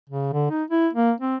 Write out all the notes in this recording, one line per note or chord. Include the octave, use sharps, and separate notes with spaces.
C#3
D3
D#4
E4
A#3
C4